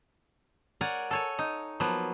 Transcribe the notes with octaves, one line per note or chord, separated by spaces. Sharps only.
A#4 C#5 D5 F#5 G#5
A4 C#5 G#5
D#4
F3 F#3 A#3 B3